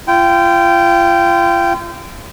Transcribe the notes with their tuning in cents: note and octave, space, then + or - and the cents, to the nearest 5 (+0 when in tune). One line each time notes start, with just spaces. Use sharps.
F4 -35 G5 -10